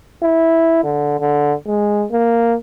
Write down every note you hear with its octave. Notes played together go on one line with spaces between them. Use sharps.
E4
D3
D3
G#3
A#3